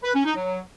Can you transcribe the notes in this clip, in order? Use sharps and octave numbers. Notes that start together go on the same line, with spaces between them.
B4
C#4
D#4
F#3